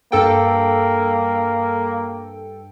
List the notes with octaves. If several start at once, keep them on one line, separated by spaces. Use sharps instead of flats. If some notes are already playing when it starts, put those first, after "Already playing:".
G2 A#3 A4 G5